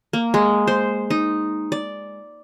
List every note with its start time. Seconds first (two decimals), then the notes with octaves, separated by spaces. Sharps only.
0.13 A#3
0.34 G#3
0.67 C5
1.10 D#4
1.72 D5